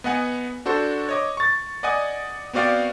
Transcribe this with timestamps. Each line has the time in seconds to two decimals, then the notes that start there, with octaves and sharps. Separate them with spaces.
0.04 B3 D#5 F#5 G#5
0.66 D4 F#4 A4 C5
1.09 C#5 D#5 D6
1.37 C#6 A6
1.83 D5 D#5 F#5 G#5 D#6
2.53 B3 C4 F#4 D5 F5 G5